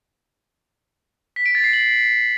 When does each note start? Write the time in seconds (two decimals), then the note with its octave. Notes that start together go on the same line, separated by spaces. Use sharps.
1.36 B6
1.46 D7
1.55 A6
1.64 C7
1.73 F#7